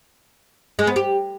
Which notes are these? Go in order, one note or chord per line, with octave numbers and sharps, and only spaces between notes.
G#3
B3
G4